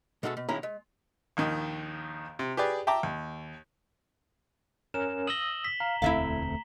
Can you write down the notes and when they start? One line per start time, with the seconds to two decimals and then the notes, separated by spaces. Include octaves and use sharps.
0.23 B2 G#3 A3 F#4 G4 A4
0.37 B2
0.49 B1 D#3 G#3 C#4 E4 A#5
0.63 G#3
1.37 A#1 D#2 D#3
2.39 C3
2.57 G4 G#4 B4 D5
2.87 E5 G5 A5 A#5 D6
3.03 D#2
4.94 C#4 A#4 E7
5.27 D#6 E6 A#6 F#7 G7
5.65 B6
5.80 F5 A#5
6.02 E1 D2 A3 C4 E4 E5 F5